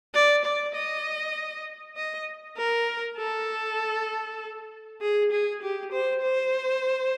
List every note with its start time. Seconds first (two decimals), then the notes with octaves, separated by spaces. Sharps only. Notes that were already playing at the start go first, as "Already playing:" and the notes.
0.14 D5
0.45 D5
0.75 D#5
1.96 D#5
2.58 A#4
3.18 A4
5.01 G#4
5.32 G#4
5.62 G4
5.92 C5
6.23 C5